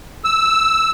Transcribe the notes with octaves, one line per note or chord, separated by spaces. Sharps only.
E6